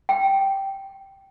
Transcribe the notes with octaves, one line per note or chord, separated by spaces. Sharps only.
G5